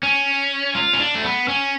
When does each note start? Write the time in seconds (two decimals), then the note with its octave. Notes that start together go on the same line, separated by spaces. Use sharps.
0.03 C#4
0.75 F4
0.93 C#4
0.99 D4
1.15 A3
1.24 B3
1.48 C#4